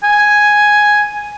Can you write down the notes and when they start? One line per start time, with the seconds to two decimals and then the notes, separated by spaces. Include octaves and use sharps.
0.04 G#5